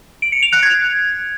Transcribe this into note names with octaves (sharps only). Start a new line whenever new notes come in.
D7
C#7
F7
F#6
G#6